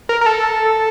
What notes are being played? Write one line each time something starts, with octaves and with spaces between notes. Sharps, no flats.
A#4
A#4
A4